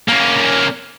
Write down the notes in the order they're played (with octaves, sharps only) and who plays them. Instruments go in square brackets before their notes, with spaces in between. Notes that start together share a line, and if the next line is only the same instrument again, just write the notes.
[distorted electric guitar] A#3 C#4